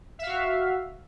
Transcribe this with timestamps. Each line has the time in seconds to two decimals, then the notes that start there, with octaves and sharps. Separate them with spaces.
0.19 E5
0.23 F5
0.27 F#4